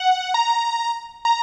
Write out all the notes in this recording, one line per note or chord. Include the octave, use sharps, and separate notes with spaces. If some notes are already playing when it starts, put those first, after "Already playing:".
Already playing: F#5
A#5
A#5